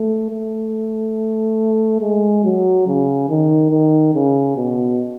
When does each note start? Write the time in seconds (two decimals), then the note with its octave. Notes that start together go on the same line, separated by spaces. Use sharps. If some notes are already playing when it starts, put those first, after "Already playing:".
Already playing: A3
0.30 A3
2.01 G#3
2.44 F#3
2.87 C#3
3.29 D#3
3.71 D#3
4.14 C#3
4.57 B2